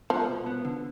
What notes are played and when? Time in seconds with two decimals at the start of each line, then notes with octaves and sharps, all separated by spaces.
0.10 F3 B3
0.29 B2
0.46 B3
0.65 D3